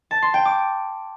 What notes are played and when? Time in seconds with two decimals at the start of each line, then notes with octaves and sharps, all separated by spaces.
0.11 A5
0.22 C6
0.34 G5
0.45 D6